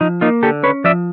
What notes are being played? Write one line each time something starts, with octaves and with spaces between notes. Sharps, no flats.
F3 D#4
A#3 D#4 F4
D3 G4 A4
C#4 B4 C#5
F3 D5 E5